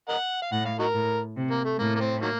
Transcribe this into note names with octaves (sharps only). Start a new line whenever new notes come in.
A#4 D#5 F#5
F5
A2 F#5
F5
D#4 F#4 A#4
A2
C3
A#3
A3
A2 A#3
A#3
C4
D#3 F#3 A#3